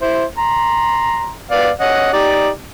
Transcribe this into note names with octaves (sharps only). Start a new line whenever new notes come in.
E4 C5
A#5 C6
B3 D5 F5
C#4 D#5 F#5
D#4 G4 D5